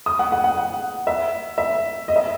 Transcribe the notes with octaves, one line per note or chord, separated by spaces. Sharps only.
D#6
F#5
F#5
F#5
F#5
E5
E5
D#5
E5